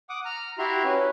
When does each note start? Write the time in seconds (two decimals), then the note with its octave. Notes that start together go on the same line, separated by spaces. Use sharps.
0.09 F#5 D6 D#6
0.25 A#5 F6
0.58 E4 F#4 G4 E5 A#5 C6
0.84 C#4 B4